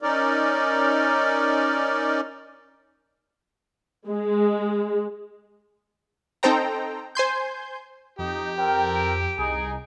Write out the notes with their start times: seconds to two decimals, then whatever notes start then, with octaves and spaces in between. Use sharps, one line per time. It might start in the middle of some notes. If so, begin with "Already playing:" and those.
0.02 C#4 D#4 A#4 D5
4.09 G#3
6.43 C4 D#4 A4 C5 G5 A#5
7.15 C5 G#5 C6 G6
8.19 F2 D#4 G4
8.58 C4 A4 A#4 G5
8.96 D7
9.38 C2 D#4 G#4